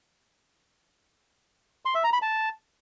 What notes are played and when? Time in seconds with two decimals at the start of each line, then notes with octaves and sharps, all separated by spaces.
1.85 C6
1.95 E5
2.04 A#5
2.13 B5
2.22 A5